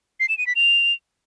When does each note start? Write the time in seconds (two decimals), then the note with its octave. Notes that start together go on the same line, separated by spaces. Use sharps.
0.20 C7
0.29 E7
0.38 D#7
0.47 B6
0.56 F7